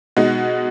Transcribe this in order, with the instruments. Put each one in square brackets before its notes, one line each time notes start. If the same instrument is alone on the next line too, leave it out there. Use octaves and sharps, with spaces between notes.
[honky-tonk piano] B2 G#3 D#4 F#4